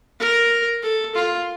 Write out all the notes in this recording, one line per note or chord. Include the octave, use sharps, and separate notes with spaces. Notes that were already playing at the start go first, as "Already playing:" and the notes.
A#4
A4
F4